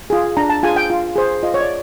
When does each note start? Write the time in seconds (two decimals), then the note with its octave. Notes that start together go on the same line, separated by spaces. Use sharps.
0.10 F4 G#4
0.37 D4 A#5
0.49 A5
0.63 F4 G#4 G#5
0.76 G5
0.90 F4
1.16 G#4 C5
1.43 F4 D#5
1.54 C#5
1.61 D5